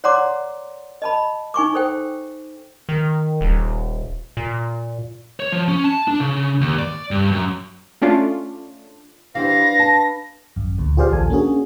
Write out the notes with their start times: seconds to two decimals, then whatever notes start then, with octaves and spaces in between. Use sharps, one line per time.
0.04 C#5 D5 F#5 A#5 C6 D6
1.02 D#5 A5 B5
1.54 D#4 G#5 C#6 D6
1.74 A4 C5 G5
2.89 D#3
3.41 D#1
4.37 A#2
5.40 C#5
5.52 F3
5.68 C#4
5.84 A5
6.08 D4
6.20 C#3
6.61 D#2
6.79 D5
7.11 G2
7.31 F#2
8.02 A3 C#4 D4 F4
9.35 E3 D4 G4 B4 C5 F5 A#6
9.79 A5
10.56 G#1 F#2
10.78 D2 A#2
10.97 F4 G4 G#4 C5 D5 F5
11.10 A#1 D#2 A4 G#5
11.30 A#3 C#4 D4 F#4 G#4